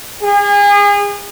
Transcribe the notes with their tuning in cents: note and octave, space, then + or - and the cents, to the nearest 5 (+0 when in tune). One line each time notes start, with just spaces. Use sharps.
G#4 -35